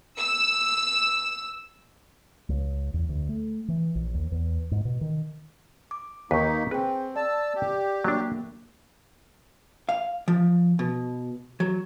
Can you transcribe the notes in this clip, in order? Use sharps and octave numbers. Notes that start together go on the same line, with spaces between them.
E6
C#2
E2
D2
A3
E3
A#1
D#2
E2
G#2
B2
D#3
D6
D#2 A#3 D#4 B4 C#6 B6
C4 G#4 B4 G5
D5 A5 E6
G4
F#3 A#3 D4
F5
F3
B2
F#3